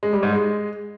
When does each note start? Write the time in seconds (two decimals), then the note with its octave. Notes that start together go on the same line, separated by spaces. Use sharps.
0.03 G#3
0.13 G3
0.23 G#2
0.33 G#3